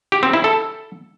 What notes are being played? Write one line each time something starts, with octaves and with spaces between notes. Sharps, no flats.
G4
C4
E4
A4